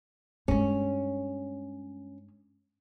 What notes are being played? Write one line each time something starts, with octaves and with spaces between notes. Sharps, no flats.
G2 G#3 C#4